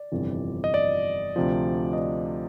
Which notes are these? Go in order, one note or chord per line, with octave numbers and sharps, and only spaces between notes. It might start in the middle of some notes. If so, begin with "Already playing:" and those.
Already playing: D5
G1 F2 C3 E3
D#5
D5
D2 C3 F3
D#5
D5